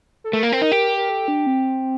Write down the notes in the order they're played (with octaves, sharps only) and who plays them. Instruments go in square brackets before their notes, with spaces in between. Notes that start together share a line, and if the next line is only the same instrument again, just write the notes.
[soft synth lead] A4
[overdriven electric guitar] A3 [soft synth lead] A#4
[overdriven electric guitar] A#3
C4
D#4
G4
[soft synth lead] A#4
A4
D4
C4